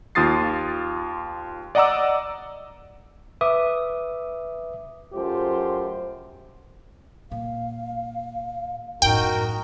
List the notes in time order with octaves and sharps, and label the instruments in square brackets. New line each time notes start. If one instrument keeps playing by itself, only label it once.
[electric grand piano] D#2 F4 D#6 A6 C7
D5 D#5 F#5 A#5 D6 E6
[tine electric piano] B4 E5 D6 D#6
[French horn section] F#2 A3 F4 G4 C5
[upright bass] A#2 [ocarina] F5
[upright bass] F#2 A2 [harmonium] D#4 F#4 A#4 [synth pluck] G5